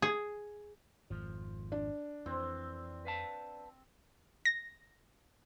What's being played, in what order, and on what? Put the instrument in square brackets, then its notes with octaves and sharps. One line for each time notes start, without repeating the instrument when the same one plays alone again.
[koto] G#4
[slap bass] G#1 F2 [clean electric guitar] F3
[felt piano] D4
[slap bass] F2 [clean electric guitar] E3 [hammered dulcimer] C4
[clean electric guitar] B4 F5 A5
[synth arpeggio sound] A#6